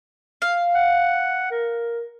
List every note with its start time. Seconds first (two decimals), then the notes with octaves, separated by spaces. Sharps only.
0.42 F5
0.75 F#5
1.51 A#4